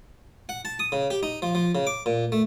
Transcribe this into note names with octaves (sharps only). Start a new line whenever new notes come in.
F#5
A5
D#6
C#3
G4
D#4
F3
F3
C#3
D6
A#2
A3